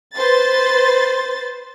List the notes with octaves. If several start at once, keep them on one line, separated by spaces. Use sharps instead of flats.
B4 C5 C6 A6